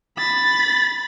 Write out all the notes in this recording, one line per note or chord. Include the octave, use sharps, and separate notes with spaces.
B5 A6